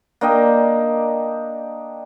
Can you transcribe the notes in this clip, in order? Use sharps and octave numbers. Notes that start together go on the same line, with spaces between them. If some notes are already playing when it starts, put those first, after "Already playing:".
A#3 D4 D#5 G5